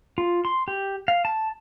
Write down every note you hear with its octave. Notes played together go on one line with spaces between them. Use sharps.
F4
C6
G4
F5
A5